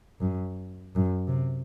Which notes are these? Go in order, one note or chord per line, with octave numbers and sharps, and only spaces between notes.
F#2
F#2
C3